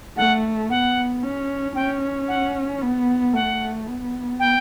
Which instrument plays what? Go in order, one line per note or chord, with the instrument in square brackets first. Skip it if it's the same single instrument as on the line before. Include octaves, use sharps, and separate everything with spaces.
[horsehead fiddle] A3 [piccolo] F#5
[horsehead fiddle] B3 [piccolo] F#5
[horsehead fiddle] C#4
[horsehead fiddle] C#4 [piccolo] G5
[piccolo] F#5
[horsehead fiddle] B3
[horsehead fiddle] A3 [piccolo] F#5
[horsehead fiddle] B3
[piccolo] G5